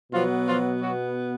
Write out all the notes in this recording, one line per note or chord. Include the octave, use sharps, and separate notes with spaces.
B2 F3 F#3 B3 F4
F3 F4
F#3 F#4